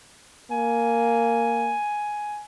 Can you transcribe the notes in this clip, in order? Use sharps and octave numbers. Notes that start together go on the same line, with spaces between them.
A#3 G#5